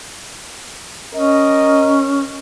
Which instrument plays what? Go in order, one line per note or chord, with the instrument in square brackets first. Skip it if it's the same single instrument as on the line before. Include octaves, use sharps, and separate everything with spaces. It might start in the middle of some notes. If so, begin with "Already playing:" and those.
[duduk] C#4 [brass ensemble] A#4 D#5